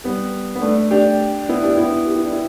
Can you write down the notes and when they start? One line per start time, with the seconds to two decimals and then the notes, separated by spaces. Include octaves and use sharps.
0.04 G3 B3
0.55 B3
0.62 A3 D4
0.91 D4 G4
1.49 B3 E4
1.63 D4 G4
1.77 B3 E4
2.06 G4
2.16 E4
2.25 D4
2.33 E4